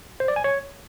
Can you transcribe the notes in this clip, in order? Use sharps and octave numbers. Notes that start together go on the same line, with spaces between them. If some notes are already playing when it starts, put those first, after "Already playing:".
C5
D5
G#5
C#5